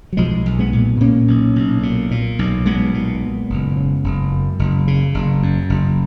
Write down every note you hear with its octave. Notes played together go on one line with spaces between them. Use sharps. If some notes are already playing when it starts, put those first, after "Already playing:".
F#3
B1 F3 G#3
B1
G#3 B3
A#2
A#2 A#3 C#4
B1
B1
A#2
A#2
B1
B1 G#3 B3
A#2
A#2
F#1
C#3
F#1
F#2
F#1
C#3
F#1
F#2
F#1